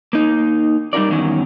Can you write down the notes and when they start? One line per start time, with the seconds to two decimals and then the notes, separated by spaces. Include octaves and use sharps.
0.13 A#3 D#4
0.93 G3 D#4 F#4 A#4 D5
1.09 E2 G2 D#3 F#3 C#4